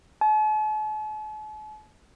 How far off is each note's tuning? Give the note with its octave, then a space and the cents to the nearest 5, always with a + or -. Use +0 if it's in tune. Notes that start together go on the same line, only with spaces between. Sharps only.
A5 -45